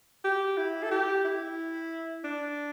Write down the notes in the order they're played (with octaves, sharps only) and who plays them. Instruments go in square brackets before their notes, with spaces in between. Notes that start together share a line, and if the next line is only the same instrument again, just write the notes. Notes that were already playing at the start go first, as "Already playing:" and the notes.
[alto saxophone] G4
E4
A4
G4
E4
D4